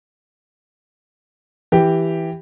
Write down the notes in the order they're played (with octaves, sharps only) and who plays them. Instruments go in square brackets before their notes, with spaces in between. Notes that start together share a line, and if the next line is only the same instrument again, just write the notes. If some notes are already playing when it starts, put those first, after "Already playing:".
[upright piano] E3 G4